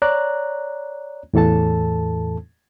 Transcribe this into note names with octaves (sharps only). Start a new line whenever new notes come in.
C#5 D5 A#5 F#6
E2 A2 E3 A4 A5